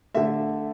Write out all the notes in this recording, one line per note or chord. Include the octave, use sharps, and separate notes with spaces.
D3 A3 E5